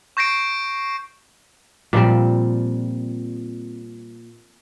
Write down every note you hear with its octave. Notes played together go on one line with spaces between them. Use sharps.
C#6 G6 A#6 C7 D7
A#2 F3 G3 C4